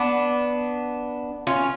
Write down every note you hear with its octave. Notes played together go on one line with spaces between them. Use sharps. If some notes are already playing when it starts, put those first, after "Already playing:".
Already playing: B3 D4
C#4 F4